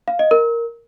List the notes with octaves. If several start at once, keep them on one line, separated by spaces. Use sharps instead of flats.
F5
D#5
A#4